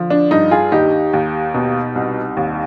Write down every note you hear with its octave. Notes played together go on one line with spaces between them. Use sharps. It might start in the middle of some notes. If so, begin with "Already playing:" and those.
Already playing: D3 F3
D4
G2 D#4
F4 G#4
D#2 D#4 G4
D#2
B2
C2
D#2